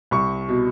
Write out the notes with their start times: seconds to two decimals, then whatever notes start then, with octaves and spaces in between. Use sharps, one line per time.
0.11 C2 C#6
0.49 B2